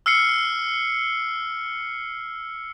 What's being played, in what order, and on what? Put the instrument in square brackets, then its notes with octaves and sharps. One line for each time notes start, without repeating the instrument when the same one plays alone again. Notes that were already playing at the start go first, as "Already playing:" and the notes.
[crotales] E6 F6 C7 C#7